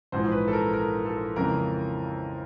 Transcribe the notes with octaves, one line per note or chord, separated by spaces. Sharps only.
A#1 G#2 E3 G#3 C5
B4
A4
A#4
A#4
A4
F2 C#3 E3 G#3 A#4